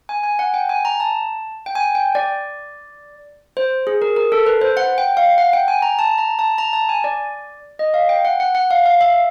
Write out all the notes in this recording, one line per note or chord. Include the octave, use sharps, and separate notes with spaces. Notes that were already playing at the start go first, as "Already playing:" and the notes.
G#5
G#5
F#5
G5
G#5
A#5
A5
G5
G#5
G5
D5
C5
G#4
A#4
A#4
A4
B4
C5
F#5
G5
F5
F#5
G5
G#5
A#5
A5
A#5
A5
A#5
A5
G#5
D5
D#5
F5
G5
F#5
F#5
F#5
F5
F5
E5